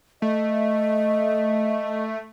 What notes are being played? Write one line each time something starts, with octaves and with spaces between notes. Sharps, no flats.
A3 D#5